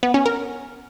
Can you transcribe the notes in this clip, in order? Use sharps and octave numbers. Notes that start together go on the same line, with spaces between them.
B3
C#4
A#4